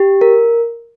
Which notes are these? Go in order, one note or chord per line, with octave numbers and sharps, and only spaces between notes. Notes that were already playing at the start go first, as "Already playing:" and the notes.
Already playing: G4
A#4